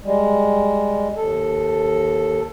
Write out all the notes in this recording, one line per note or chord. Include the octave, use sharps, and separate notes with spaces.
G3 G#3
D#2 A4